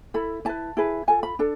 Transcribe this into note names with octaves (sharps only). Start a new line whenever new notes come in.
E4 A4 B5
E4 B4 A5
E4 G#4 B4
F4 A4 G#5
B5
D4 A4 A5